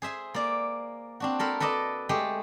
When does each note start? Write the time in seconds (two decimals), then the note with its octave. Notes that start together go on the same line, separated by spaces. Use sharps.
0.02 G#4 C5 E5 G#5
0.34 A#3 D5
1.20 C4 D4 F#4
1.39 A4 A#4 C5 B5
1.60 A4 B4 D5 D#5 A5
2.09 G#3 A3 G4